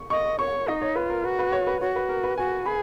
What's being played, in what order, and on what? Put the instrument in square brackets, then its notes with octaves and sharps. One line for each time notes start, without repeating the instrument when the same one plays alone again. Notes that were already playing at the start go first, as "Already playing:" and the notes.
Already playing: [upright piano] C#6
[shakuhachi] D#5 [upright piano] C#6
[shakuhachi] C#5 [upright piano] C#6
[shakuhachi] D#4 [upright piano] D#5
[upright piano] C#5
[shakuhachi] F4 [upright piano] B4
[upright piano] A#4
[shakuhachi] F#4 [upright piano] B4
[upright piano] B4
C#5
B4
[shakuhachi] F#4 [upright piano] C#5
[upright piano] B4
A#4
B4
[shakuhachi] F#4 [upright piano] G#5
[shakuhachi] G#4 [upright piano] B5